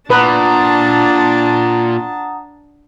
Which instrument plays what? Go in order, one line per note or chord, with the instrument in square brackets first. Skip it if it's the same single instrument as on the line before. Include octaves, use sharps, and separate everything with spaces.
[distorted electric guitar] A#2 [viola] D4 A5 [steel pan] B4 [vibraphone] F#5 A#5 D#6